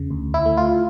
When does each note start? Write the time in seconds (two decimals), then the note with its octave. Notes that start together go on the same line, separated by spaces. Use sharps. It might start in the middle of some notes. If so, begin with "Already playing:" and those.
Already playing: E2 C#3
0.10 D2
0.34 E4
0.46 A3
0.57 F4